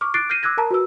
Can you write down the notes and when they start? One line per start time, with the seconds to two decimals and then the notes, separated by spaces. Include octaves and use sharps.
0.01 C#6 D6 F6
0.14 D6 F#6 A6 C7 D7
0.29 F6 G6 A#6 C7 D#7
0.43 D6 E6 F#6 G#6 A#6
0.57 A#4 A5 A#5
0.71 F#4 B4 E6